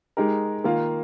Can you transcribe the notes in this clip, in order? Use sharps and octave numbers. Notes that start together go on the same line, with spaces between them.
G#3 D#4 G4 A#4
D#3 A#3 F4